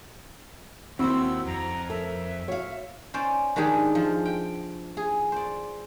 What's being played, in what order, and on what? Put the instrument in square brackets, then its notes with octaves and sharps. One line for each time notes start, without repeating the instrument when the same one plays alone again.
[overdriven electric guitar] D#2 [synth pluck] C4 E4 [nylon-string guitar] F#4 C5 [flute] E6
[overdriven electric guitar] F2 [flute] A#5
[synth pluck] A4 [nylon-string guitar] A#4 [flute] E5
[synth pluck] F#4 [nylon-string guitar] C#5 F5
[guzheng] C#4 C5 D5
D#3 G#3 D4 G4 G#4
F3
G5
G#4
C5 D5